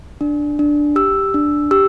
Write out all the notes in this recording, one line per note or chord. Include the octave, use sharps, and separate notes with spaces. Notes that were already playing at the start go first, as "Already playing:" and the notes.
D4
D4
G4 E6
D4
G4 E6